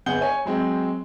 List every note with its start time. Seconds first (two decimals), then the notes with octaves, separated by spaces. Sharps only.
0.06 G1 G#4 F#5 G6 G7
0.21 C#5 G#5
0.45 F#3 G#3 C4